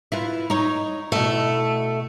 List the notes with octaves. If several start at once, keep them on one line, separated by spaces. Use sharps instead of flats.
E4 F4 B4
D#4 C#5
B2 A3 E4